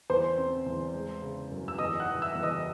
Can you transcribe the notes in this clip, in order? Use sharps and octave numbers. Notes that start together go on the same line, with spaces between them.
E2 C5 C6
C4
E2
G#3
C#3
F#2
E6
E2 D#5 D#6
F#5 F#6
E3
E5 E6
E2
D#5 D#6